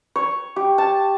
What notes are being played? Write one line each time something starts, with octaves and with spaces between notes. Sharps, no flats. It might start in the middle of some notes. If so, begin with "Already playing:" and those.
C#5
G4
A5